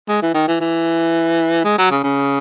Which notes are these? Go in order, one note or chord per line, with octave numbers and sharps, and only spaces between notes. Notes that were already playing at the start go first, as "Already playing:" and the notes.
G#3
E3
D#3
E3
E3
G#3
F#3
C#3
C#3